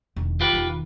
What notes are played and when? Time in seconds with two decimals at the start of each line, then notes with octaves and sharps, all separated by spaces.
0.16 E1 D#3
0.41 F4 G4 B4
0.53 E1 D#3